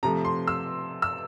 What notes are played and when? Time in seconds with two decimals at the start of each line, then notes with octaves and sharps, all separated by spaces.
0.03 C3 F3 A3 A#5
0.25 C6
0.48 E6
1.02 E6